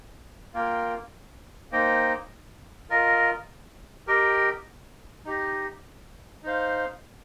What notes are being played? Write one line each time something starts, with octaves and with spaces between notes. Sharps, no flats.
A#3 F4 A#4 G5
A#3 D#4 C5 D#5 G5
F4 A#4 D#5
G4 A#4 D#5 G5
D#4 G4 D#5
D#4 C5 F5